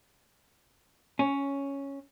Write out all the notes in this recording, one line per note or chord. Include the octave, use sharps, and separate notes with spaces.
C#4